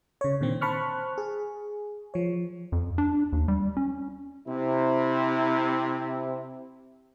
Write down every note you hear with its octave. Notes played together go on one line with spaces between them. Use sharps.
C#3 C#5
A#2 D3 D#3 C4
C5 A5 B5 C#6 F6 F#6
G#4
F3 C#5
F2
D4
D#2
G3
C#4
C3 E4